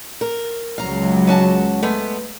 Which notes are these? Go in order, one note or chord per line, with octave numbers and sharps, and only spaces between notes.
A#4
C#2 F#3 F5 A#5
C#4 F#4 A5
G#3 A3 B3